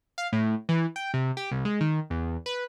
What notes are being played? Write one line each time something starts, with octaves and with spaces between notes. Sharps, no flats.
F5
A2
E3
G5
C3
G4
C2
G#3
D#3
E2
B4